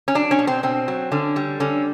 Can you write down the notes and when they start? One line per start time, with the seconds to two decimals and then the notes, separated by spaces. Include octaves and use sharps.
0.08 C#4
0.15 F#3 D4
0.31 C#4
0.39 B2
0.47 C4
0.63 B2 C4
0.88 F#3
1.12 D3 C#4
1.36 G3
1.60 D3 C#4